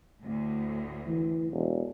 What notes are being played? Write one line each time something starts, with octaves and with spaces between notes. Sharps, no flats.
D2 A2
E3
E1